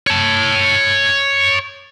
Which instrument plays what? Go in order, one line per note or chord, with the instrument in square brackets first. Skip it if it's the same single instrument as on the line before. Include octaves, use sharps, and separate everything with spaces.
[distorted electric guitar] C#5 A5